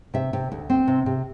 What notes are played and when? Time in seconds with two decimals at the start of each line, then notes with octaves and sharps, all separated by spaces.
0.14 C3 E5
0.33 C3
0.52 D2
0.70 C4
0.88 C3
1.06 C3